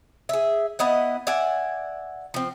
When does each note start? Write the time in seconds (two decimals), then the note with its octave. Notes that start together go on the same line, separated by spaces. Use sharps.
0.29 G#4 E5
0.79 B3 E4 D#5 F#5
1.27 D5 E5 F#5 G#5
2.34 F3 C4